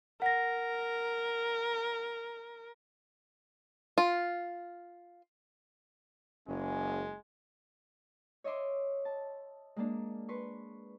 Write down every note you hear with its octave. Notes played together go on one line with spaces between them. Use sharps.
A#4 F#5 A#6
F4
F#1 G#3 C#4
C#5 D#5 E5 C6 D6
A5
G#3 A#3 D4
B4 C6 C#6